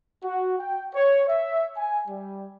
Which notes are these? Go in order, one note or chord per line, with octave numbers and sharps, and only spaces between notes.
F#4
G5
C#5
E5
G#5
G3